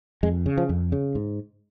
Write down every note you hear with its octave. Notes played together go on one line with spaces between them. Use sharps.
F2 G#3
C#3
F3
F2
C#3
G#2